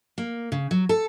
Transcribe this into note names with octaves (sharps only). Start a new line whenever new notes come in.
A#3
C#3
F#3
A4